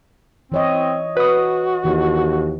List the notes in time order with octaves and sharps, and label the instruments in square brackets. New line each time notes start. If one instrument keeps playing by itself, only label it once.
[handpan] E3 C#5 D#5 [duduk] C4
[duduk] F#4 [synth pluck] B4 D#6
[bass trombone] D#2 [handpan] E3